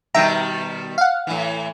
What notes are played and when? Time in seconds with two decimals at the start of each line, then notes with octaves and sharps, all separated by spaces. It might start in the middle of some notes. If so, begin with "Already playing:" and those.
0.14 B2 D#3 G3 E5 G5 A#5
0.98 F5 F#5
1.27 A2 E3